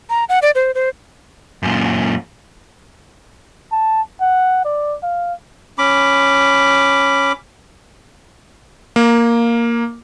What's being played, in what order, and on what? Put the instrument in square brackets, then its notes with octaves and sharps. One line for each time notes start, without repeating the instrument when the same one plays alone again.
[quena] A#5
F#5
D5
C5
C5
[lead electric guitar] F#2 A#2
[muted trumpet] A5
F#5
D5
F5
[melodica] C#4 B5 D6
[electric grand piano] A#3